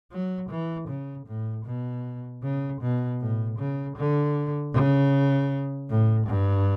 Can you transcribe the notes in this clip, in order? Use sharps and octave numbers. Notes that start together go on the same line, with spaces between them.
F#3
E3
C#3
A2
B2
C#3
B2
A2
C#3
D3
C#3
A2
G2